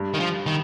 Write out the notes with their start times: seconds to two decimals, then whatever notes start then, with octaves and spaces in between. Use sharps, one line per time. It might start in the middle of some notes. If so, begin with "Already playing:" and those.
Already playing: G2
0.14 D#3
0.20 F3
0.46 D#3